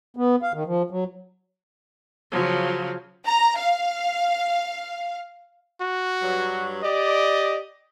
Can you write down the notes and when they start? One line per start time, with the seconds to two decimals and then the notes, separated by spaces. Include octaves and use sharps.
0.17 B3
0.42 F5
0.54 D#3
0.66 F3
0.90 F#3
2.31 C#3 F3 F#3
3.26 A#5
3.58 F5
5.81 F#4
6.21 G2 F#3
6.83 G4 D5 D#5